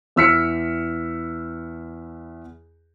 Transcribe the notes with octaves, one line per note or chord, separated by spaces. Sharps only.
E2 E4 E6 F6 B6 C#7